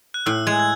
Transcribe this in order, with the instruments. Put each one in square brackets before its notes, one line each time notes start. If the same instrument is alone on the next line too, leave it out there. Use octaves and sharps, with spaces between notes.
[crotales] F#6
[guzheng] A2 [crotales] E6
[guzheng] G#3 [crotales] G#6
[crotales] G#6